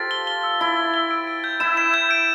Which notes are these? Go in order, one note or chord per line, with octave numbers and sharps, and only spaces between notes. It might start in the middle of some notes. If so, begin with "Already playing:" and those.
Already playing: F4 G4 A4 C5 A6
G7
G7
E6
E4 A6
A6
G7
D7
D7
G6
E4 E7
E7
G6
D7